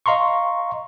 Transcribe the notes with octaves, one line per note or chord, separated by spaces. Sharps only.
D#5 F5 A#5 C6 C#6